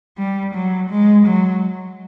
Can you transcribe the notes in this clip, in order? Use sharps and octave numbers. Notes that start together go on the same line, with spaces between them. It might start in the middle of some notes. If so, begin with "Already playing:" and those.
G3
F#3
G#3
F#3